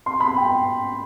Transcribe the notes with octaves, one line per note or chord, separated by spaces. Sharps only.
C6
B5
G5